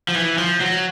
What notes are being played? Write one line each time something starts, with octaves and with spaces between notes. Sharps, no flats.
F3
E3
F3
F#3